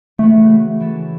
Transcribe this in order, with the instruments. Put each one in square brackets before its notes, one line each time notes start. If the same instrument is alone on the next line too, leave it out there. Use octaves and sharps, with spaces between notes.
[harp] C#3 E3 B3 F#4 B4 [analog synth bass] A3
[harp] E3 C#4 A4